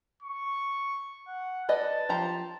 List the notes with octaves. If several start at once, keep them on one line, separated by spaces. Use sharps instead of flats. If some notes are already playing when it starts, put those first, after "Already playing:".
C#6
F#5
B4 D5 D#5 A5
F3 G4 A#5